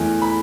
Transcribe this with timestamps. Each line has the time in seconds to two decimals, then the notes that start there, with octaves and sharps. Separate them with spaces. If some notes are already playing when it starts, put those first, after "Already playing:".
Already playing: E2 E3 A3
0.22 B5